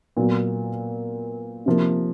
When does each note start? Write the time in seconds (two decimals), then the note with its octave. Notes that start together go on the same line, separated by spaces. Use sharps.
0.16 A#2 F#3 B3
1.66 C3 F3 A#3